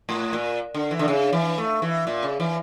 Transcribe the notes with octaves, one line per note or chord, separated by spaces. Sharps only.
A2
A#2
D3
E3
D3
C#3
E3
A3
E3
A#2
C#3
E3